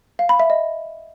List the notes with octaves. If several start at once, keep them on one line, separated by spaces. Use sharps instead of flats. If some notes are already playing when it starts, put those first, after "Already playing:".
F5
B5
E5
D#5